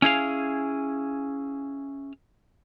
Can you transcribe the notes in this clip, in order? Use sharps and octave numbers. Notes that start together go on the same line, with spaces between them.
C#4 E4 G#4 F5